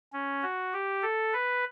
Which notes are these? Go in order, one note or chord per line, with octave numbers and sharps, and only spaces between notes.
C#4
F#4
G4
A4
B4